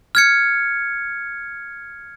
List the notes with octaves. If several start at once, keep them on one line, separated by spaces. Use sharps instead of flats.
F6 G#6 C#7